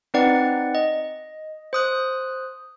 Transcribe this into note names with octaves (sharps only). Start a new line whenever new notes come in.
C4 D#4 B4 D5 F#5
D#5
C5 D#6 F#6